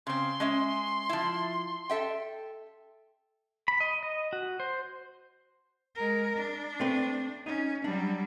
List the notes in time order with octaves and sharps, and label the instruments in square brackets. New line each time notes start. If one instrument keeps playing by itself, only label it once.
[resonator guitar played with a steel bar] C#3 C4 [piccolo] C6
[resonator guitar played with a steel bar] G#3 C#4 E5
F3 E4
A4 E5 G5
[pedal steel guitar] B5
D#5
D#5
F#4
C5
[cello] G#3 A#4
D4
[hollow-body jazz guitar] A3 C4 B4
[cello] C#4 [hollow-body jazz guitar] D#4
[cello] F#3 G3 [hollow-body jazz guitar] D4